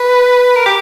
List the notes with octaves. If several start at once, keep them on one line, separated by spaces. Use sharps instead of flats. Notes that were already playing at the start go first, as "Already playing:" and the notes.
Already playing: B4
A#4
G4